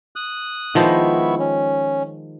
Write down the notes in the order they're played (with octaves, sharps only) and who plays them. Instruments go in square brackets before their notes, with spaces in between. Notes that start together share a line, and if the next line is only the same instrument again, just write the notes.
[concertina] D#6 F#6
[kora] D#3 F3 G#3 [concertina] B3 E4 C#6
[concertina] C#4